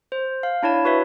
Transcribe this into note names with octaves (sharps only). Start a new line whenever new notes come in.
C5
F5
D4 E4 C#5 A5
F#4 B4 C#5 E5